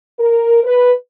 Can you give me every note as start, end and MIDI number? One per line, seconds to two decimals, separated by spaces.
0.20 0.61 70
0.64 0.91 71